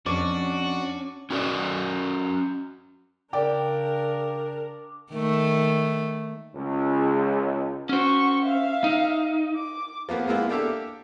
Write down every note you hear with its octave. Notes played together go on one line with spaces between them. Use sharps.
F2 C#4 D4 F#4 D5
C#4 F#4 A#4 C5 D5 D#5
C#3 D4 A#4 D5 G5 D6
D#3 A3
C#2
C#4 F#4 C5 C#6
E5 F5
D#4
D6
F3 A#3 B3
G#3 A#3 B3 E4 F4
A#3 D4 G4 A4 E5 D6